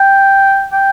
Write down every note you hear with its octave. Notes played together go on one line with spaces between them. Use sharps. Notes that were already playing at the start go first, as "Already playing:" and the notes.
Already playing: G5
G5